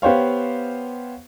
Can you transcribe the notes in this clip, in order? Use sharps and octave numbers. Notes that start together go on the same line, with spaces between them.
B3 G4 C5 C#5 F5